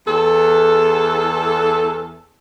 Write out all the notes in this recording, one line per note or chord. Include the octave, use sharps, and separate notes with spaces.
E2 A4